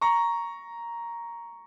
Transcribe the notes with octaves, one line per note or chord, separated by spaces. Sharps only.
A#5 C#6